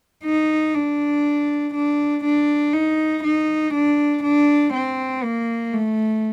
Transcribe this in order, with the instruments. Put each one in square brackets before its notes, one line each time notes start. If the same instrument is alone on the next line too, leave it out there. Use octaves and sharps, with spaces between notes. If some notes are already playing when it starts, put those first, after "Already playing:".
[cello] D#4
D4
D4
D4
D#4
D#4
D4
D4
C4
A#3
A3